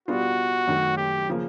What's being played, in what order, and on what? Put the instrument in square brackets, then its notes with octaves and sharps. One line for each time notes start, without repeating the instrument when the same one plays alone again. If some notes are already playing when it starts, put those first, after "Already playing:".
[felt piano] B2 G3 B3 D4 F4 [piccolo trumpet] F#4
[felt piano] F#2 D#3 F#3 A3
[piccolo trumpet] G4
[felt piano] C#3 F3 A#3